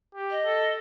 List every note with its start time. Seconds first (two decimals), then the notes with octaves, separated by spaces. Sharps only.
0.15 G4
0.30 D#5
0.45 A4